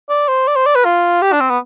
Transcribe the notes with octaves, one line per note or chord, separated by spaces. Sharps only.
D5
C5
D5
C5
D5
B4
F4
G4
D4
C4
B3